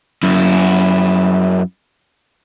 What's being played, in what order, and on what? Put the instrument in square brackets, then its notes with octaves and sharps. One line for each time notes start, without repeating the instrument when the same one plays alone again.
[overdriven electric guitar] F#2 E4